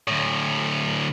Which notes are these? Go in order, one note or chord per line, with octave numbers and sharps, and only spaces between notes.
D2 A2